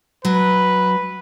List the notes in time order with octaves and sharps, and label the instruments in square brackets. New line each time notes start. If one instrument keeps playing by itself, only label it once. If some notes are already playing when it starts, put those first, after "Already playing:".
[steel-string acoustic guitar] F#3 [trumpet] B4